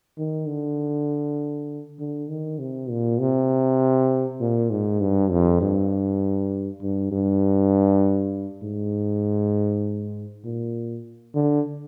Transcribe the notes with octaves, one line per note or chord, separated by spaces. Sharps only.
D#3
D3
D3
D#3
C3
A#2
C3
A#2
G#2
G2
F2
G2
G2
G2
G#2
A#2
D3